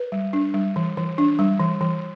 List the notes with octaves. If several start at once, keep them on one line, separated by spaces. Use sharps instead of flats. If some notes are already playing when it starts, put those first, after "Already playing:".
Already playing: B4
G3
D4
G3
E3
E3
D4
G3
E3
E3